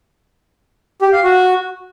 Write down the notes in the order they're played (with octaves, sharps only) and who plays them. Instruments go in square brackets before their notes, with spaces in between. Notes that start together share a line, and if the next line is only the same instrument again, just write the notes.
[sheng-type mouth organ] G4
F5
F#4